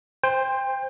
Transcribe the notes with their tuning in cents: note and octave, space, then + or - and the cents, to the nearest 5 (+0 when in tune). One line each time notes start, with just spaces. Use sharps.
C5 +0 G5 +30